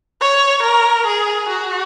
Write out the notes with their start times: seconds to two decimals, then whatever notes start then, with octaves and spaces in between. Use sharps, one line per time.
0.21 C#5
0.63 A#4
1.06 G#4
1.49 F#4